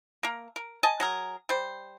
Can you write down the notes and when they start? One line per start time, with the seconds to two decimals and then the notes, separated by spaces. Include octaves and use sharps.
0.23 A#3 A#4
0.56 A#4
0.83 D#5 G#5 A5
1.00 F#3 G#4 A#4
1.49 G3 C5